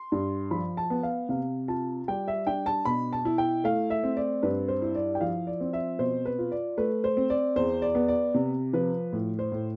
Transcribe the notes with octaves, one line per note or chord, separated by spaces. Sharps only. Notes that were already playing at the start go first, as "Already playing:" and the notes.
Already playing: C6
G2
F3 B5
A5
B3
F5
C3 F5
F4 A5
G3 G5
E5
D4 G5
A5
B2 B5
A5
E4
G5
A3 F5
E5
C4
D5
G2 B4
C5
E4
D5
G5
F3 F5
D5
C4
E5
B2 C5
B4
F4
D5
A3 B4
C5
C4
D5
E2 C5
D5
B3
D5
C3
F3 B4
A2
C5
A2